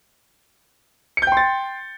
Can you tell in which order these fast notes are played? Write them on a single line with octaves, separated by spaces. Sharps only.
C#7 G6 G5 C6 A6